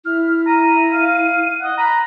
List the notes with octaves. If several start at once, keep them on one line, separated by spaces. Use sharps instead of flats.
E4 F6
A#5 D#7
F5
D#5 F#5
A#5 B5